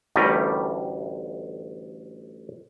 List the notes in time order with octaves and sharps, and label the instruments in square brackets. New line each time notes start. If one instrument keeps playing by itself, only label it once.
[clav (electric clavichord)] A1 D2 G3 A3 A#4 D#5